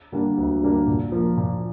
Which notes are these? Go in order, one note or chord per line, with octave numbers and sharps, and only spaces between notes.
D3 G3 A#3 D4
D2
D3 G3 A#3 D4
A#2
F3 A#3
A#2